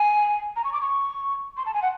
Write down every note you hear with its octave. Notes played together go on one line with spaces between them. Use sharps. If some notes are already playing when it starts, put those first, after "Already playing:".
Already playing: G#5
A#5
C#6
D6
C#6
C6
A5
G#5
F#5